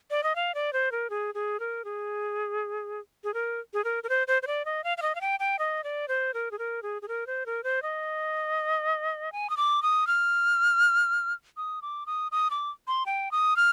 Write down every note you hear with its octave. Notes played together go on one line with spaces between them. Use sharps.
D5
D#5
F5
D5
C5
A#4
G#4
G#4
A#4
G#4
G#4
A#4
G#4
A#4
A#4
C5
C5
C5
D5
D#5
F5
F5
D#5
F5
G5
G5
D#5
D5
C5
A#4
G#4
A#4
G#4
G#4
A#4
C5
A#4
C5
D#5
G#5
D#6
D6
D#6
F6
D#6
D6
D#6
D#6
D6
C6
G5
D#6
F6